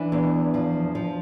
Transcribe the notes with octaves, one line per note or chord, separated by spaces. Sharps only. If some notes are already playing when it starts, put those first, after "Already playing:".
Already playing: E3 D4
E2
F3
F3